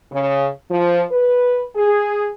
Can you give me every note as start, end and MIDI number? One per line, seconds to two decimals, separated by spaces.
0.12 0.48 49
0.69 1.03 53
1.10 1.63 71
1.75 2.29 68